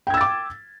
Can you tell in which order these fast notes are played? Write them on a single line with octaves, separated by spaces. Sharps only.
G5 G#6 E6 A6 D6